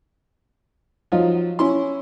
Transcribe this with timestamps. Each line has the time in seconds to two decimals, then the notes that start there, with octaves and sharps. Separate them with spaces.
1.12 F3 F#3 D#4 F4
1.59 C#4 E4 C6